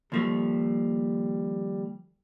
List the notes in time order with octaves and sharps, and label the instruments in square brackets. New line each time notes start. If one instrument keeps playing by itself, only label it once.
[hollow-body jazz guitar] D#2 F3 A3 [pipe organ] G3